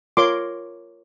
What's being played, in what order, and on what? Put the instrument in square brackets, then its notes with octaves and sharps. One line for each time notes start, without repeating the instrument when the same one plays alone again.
[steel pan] F4 A#4 C#5 C6 D6